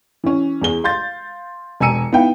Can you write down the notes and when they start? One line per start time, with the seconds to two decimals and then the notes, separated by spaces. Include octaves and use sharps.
0.24 E3 C#4
0.62 E2 G#4 G7
0.84 F5 C6 G6 A6
1.80 E1 G#5 A#5 E6 C#7 D#7
2.12 B3 D#4 E4 F5 G5